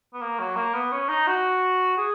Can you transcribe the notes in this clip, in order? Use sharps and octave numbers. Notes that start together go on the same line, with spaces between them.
B3
A#3
F#3
A#3
B3
C#4
D#4
F#4
G#4